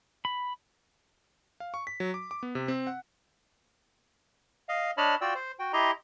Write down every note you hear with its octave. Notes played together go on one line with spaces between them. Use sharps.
B5
F5
C#6
B6
F#3
D6
D6
B3
C3
C4
F#5
D#5 F5
D4 C#5 D#5 A5 B5 F6
F4 F#4 D5 G5 E6
C5
F#4 G5
E4 G4 D#5 A#5 C6